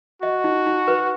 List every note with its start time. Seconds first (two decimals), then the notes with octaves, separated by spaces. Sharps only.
0.22 F#4 D#5
0.44 D#4
0.66 D#4
0.88 B4